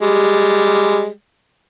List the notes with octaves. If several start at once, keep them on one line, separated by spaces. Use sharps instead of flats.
G3 G#3